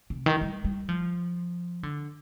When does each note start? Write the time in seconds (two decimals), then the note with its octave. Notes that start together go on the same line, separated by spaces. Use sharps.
0.10 C3
0.26 D#3
0.41 G3
0.65 G3
0.89 F3
1.83 D3